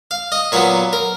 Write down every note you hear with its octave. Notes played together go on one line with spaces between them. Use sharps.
F5
D#5
A#2 F#3 B3 C#5
A#4